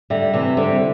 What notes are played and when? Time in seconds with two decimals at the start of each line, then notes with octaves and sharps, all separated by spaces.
0.10 D3 G3 E5
0.34 C3 E3 E5
0.57 D3 G3 C5